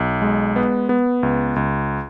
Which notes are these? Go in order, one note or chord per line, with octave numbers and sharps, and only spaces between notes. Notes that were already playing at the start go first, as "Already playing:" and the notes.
Already playing: B1
G#3
B3
B3
C#2
C#2